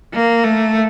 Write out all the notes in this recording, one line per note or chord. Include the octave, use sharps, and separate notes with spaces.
A#3
A3